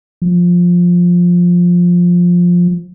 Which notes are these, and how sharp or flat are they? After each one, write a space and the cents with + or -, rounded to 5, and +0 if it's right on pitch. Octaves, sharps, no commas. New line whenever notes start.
F3 +10